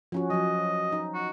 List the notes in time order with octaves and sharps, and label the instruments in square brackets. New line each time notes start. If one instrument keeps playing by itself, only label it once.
[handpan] F3 C#4 F#4
[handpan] F3 F#3 [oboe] D#5
[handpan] D#4
[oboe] F#4